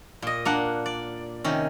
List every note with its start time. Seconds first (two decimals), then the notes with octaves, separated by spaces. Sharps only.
0.22 A#2 D#5
0.45 A#3 D4 F#5
0.86 D5
1.44 C3 D#3 C#4